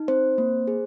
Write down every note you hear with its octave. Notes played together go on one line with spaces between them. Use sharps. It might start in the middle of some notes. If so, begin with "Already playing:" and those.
Already playing: D#4
C4 C5
A#3
G#4